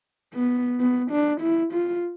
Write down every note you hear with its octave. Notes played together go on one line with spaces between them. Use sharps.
B3
B3
D4
E4
F4